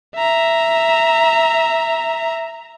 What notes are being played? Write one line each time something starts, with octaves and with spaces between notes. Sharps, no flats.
E5 A#5